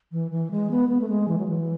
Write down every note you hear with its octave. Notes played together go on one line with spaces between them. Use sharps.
E3
E3
G#3
B3
B3
A3
G#3
E3
F#3
E3